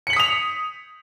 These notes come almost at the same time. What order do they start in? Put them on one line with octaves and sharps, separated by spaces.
C#7 F#7 B6 D#6 F7